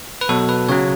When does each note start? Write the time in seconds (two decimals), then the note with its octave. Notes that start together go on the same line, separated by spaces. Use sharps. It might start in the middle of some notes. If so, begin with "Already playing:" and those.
0.21 B4
0.29 B2 F#3 A4
0.49 B4
0.69 C#3 F#3 C#5